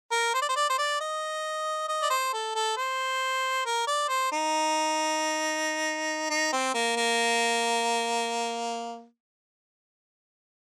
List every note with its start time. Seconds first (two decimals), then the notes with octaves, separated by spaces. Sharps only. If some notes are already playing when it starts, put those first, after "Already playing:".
0.12 A#4
0.34 C5
0.42 D5
0.49 C5
0.56 D5
0.70 C5
0.78 D5
1.01 D#5
1.89 D#5
2.02 D5
2.10 C5
2.33 A4
2.55 A4
2.77 C5
3.65 A#4
3.87 D5
4.09 C5
4.32 D#4
6.30 D#4
6.52 C4
6.74 A#3
6.96 A#3